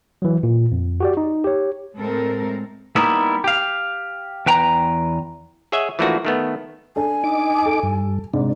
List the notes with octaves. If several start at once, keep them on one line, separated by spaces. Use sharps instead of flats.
E3 F#3
A#2
F2
F#4 G4 D5
D#4
G4 C#5
A2 G#3 C4 A4 A#4
G3 A#3 B3 D#4 E4
G4 F5
E2 B4 G5 A#5
G#4 C#5 D#5 E5 F#5 G#5
E3 F3 A3 A#3 D4 F#4
D#3 A3 B3
D4 A4 G#5
D#4 D6
A4
G2
G#2 C3 D4